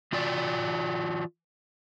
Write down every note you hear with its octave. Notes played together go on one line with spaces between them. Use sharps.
E3 F4 F#4 D5